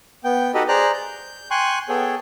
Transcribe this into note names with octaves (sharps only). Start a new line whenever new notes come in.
B3 G5
D#4 F#4 G4 A4 B4 D#5
G#4 C5 D5 A#5 F#6
G6
G5 G#5 C6 C#6 F#6
B3 G#4 A4 C#5 G5